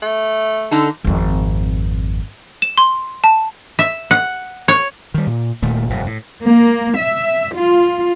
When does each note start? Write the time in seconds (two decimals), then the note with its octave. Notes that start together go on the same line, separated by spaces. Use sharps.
0.02 A3
0.71 D3 D#4 A4
1.04 G#1 F2
2.62 E7
2.78 C6
3.24 A5
3.79 E5
4.11 F#5
4.68 C#5
5.14 D#3 G3
5.27 A#2
5.62 D#1 A#2 D#3 A3
5.89 F1 G2 A#2
6.06 A2
6.44 A#3
6.98 E5
7.56 F4